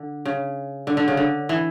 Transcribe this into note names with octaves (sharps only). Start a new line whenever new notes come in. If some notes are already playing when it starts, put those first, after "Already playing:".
Already playing: D3
C#3
D3
D3
C#3
D3
E3